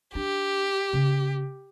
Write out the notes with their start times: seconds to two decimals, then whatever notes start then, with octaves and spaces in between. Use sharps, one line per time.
0.15 D4 G4
0.93 C#3